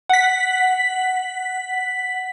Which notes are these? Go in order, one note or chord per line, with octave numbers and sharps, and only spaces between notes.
F#5 B6